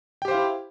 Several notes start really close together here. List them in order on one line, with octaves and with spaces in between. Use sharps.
G5 G4 C5 F5 E4